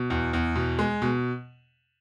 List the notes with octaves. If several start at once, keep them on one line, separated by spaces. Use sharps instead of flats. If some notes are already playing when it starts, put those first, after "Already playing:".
Already playing: B2
E2
E2
B2
G#3
B2